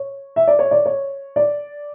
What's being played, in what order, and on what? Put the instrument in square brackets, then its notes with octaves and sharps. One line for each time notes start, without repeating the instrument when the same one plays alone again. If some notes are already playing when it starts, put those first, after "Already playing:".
Already playing: [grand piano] C#5
E5
D5
C#5
D5
C#5
D5